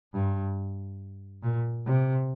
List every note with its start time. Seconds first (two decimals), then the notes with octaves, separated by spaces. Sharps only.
0.14 G2
1.43 A#2
1.86 C3